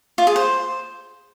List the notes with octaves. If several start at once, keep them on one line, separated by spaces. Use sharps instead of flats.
F4
G#4
C5